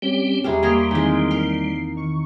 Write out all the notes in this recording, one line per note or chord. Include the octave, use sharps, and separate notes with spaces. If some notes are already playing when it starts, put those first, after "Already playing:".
G3 C4 C#4 G4
E2 G3 G#3 C#4 G4 E5 A#5
G3 A#3 A#5 C6 D#6 G#6
D#3 E3 G#3 C4 E4 G#5
A#4 C7
D#3 C#6